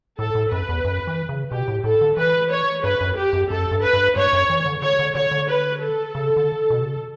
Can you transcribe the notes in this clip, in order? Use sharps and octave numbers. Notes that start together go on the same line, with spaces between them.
A2 A4
A2
F#2 B4
E2
F#2
E3
C#3
B2 G4
A2
A2 A4
D3
E3 B4
C#5
G2 B4
F#2
G4
F#2
F#2 A4
G2
B4
G2
G2 C#5
F#2
E3
D3
D3 C#5
D3
D3 C#5
D3
B4
A4
C#3
D3
B2
C#3